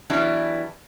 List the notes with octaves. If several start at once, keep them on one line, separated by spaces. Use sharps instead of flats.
E3 F#3 G3 B3 D4 E4